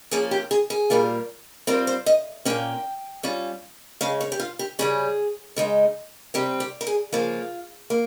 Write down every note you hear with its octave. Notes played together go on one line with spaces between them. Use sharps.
F3 A#3 C#4 F4 G#4
G4
G#4
G#4
A#2 G3 A#3 F4
G3 C4 F4 A#4
C5
D#5
A#2 F3 A#3 C#4 G5
G3 C#4 F4
C#3 G#3 C#4 F5
C#5
G4
F4
G4
C#3 G3 C#4 G#4
C#3 G#3 D#4
C3 G3 C4 G4
G4
A#4
G#4
C#3 F3 A#3 F4
A#3